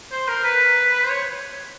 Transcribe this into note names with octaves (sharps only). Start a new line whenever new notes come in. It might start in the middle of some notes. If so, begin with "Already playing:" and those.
C5
A#4
B4
C5
C#5